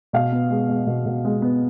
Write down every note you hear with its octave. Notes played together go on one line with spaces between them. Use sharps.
B2 F5
B3
G#3
G#3
B2
B2
G#3
B3